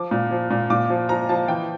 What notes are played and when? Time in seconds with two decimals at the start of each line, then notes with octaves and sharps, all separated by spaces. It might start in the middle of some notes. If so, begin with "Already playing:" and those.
Already playing: F3 D6
0.11 A#2
0.31 F3
0.51 A#2
0.70 A#2 D6
0.90 F3
1.09 F3 A#5
1.29 F3 A5
1.48 E3 G5